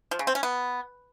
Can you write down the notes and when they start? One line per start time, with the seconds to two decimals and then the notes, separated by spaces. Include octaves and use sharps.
0.11 F3
0.19 C#3
0.27 C4
0.35 C#4
0.43 B3